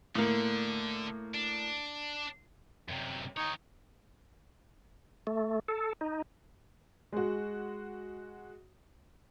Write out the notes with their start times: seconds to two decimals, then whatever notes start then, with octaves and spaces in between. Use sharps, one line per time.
0.15 A2 D3 A#3
1.34 D4
2.89 F#2 C3
3.37 D#3 D#4 C#5
5.27 A3
5.68 A4
6.01 D#4
7.13 G#3 F#4